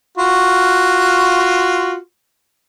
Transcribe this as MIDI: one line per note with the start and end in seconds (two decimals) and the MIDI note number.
0.18 1.96 65
0.18 1.96 66